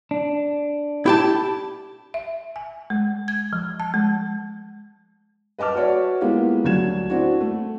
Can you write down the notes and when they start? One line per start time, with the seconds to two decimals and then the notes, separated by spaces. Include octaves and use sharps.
0.11 D4
1.06 E4 G4 A5
2.14 E5
2.56 G#5
2.90 G#3
3.28 G#6
3.53 F3
3.80 A5
3.94 G#3
5.59 B4 D#5 A5 D6 F6
5.75 F#4 B4 C#5 D5 E5
6.21 G#3 A#3 B3 E4 F4 G4
6.64 D2 F#3 D4 G#6 E7
7.10 C4 D4 E4 F#4
7.41 A3